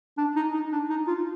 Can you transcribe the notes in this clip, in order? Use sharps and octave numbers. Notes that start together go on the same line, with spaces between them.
D4
D#4
D#4
D4
D#4
F4